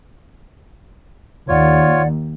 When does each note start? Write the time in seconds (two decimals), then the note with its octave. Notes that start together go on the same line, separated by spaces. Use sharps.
1.48 D#2 F4 C#5 D5 F#5